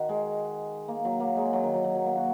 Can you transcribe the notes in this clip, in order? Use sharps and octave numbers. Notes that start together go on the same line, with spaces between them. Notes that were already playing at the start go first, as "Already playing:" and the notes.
Already playing: D#3 F#4
G#3
A#3
F#3
A#3
G#3
F#3
D#3
F#3
F#3
F#3
A#3
F#4